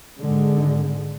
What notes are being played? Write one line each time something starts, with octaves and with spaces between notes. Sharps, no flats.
G#1 G#2 D3 G#3